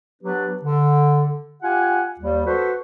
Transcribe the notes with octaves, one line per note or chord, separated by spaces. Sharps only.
F#3 B3 D4 G4 B4
D3
F4 G4 F#5 G#5
D#2 G3
F#4 A4 B4 C5